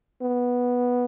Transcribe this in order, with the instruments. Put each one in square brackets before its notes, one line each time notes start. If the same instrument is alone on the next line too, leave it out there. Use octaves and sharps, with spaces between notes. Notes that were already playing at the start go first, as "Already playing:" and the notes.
[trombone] B3